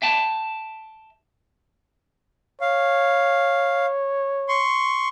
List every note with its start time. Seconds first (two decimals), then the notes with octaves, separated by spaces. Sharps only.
0.02 E5 G5 A5
2.61 C#5 F5
4.48 C6 C#6